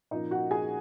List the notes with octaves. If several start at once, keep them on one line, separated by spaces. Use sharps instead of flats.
A#2 F3 A#3 C#4 D#4 D#5
F#4 F#5
G#4 G#5